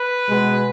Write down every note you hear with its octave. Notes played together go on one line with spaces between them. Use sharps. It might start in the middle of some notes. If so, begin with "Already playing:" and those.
Already playing: B4
B2 G#3 B3